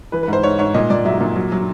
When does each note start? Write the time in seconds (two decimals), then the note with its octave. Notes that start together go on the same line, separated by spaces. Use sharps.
0.12 E3 B4
0.23 B4
0.28 G#2 C5
0.43 G#2 C#5
0.59 G#2 C#5
0.74 A#2 D#5
0.90 A#2 D5
1.05 F#3 E5
1.21 A#2
1.36 F#3
1.52 F#3